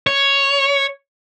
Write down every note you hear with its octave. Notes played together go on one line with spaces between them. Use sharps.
C#5